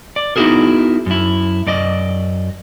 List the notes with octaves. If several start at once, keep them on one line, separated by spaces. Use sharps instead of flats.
D5
B3 D#4 E4 F#4 G#4 A#4
F#2 E4
F#2 D5 D#5